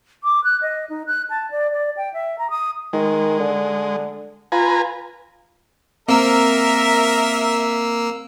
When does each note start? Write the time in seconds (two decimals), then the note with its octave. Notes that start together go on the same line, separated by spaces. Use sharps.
0.24 D6
0.44 F#6
0.62 D#5
0.90 D#4
1.07 F#6
1.30 A5
1.51 D5
1.72 D5
1.97 G5
2.14 E5
2.38 A#5
2.50 D#6
2.93 D#3 G#3
3.40 D3
4.52 F4 B4 G#5 A#5
6.08 A#3 C4 A#4 E5 E6